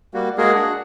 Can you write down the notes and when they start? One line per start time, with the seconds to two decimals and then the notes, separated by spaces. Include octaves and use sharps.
0.14 G3 A#3 F#4
0.38 G#3 A#3 F#4 G#4 A#4
0.55 D4 F#4 G#4 F#5